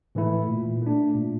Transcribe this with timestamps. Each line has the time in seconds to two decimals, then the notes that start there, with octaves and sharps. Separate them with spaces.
0.15 A2 E3 A3 E4
0.49 A#2
0.82 A3 D4
1.14 A#2